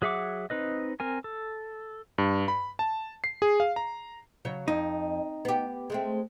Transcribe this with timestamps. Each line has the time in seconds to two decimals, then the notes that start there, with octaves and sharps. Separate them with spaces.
0.02 F#3 G#4 E5 F#5 D6
0.50 C4 D#4 B4 D#5
1.00 C4 A#4 G#5
1.24 A4
2.18 G2
2.48 B5
2.79 A5
3.24 C7
3.42 G#4
3.60 F5
3.76 A#5
4.45 C#3 F#3 C#5
4.68 F2 D#4
5.45 B3 G4
5.90 G#3 A3 C4